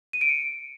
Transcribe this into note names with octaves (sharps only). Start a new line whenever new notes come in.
D#7
D7
C#7